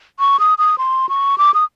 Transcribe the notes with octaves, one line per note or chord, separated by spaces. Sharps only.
C#6
D#6
D#6
C6
C#6
D6
D#6